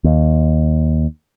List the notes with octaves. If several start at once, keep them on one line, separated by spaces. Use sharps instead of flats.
D#2